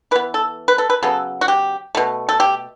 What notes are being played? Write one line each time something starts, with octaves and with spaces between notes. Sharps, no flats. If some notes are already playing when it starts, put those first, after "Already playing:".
E3 B3 B4
A4
B4
A4
B4
C#3 F#3 B3 A4
F#4
G4
B2 A3
A4
G4